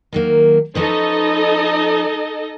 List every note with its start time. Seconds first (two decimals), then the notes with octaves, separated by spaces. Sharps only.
0.13 D#3 F#3 A#3
0.75 F3 C#4 D#4 A4 B4 D#5